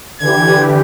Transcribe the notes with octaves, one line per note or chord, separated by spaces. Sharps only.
D3 E3 G4 G#6